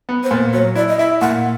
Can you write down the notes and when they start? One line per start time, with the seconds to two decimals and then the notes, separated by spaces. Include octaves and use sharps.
0.09 B3
0.24 C5
0.31 A#2
0.53 F#3 C#5
0.75 E4 D5
0.89 D#5
0.98 E4 E5
1.21 A#2 F#5